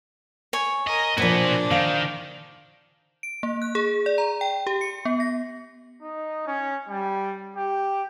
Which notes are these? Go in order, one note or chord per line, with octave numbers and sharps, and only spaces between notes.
C#5 G#5
A#4 D#5
A#2 F3 D4 F#4 B4 C5 G#5
D#3 F5
D7
A#3
F#6
G#4
D5
A#5
G5
G4
C#7
B3
A#6
D#4
C#4
G3
G4